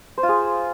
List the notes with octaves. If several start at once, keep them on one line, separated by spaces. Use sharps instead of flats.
C5
F4
G#4